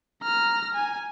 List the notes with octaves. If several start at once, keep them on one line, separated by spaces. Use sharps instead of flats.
A#5 F6
G#5